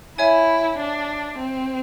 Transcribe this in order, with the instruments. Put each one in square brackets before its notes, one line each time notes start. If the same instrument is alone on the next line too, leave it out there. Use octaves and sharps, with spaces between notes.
[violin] E4 [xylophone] C#5 E5 G#5
[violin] D4
C4